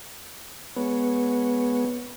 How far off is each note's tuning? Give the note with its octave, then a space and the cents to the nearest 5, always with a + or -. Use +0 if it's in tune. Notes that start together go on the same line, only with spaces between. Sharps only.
G#3 +0 B3 -10 C#5 +0